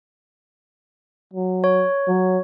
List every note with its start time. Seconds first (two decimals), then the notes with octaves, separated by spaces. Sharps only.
1.33 F#3
1.64 C#5
2.08 F#3